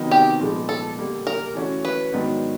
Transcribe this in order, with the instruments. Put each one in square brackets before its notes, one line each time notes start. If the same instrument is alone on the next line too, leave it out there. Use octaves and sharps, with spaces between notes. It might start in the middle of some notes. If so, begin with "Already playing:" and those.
Already playing: [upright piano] C3 D#3 F#3 B3 D#4
[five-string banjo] G4
[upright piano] A#2 F3 G#3 B3
[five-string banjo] A4
[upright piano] D3 G3 A#3
[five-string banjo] A#4
[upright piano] E3 A3 C#4 F#4
[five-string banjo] B4
[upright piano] G#2 D#3 F#3 B3 D4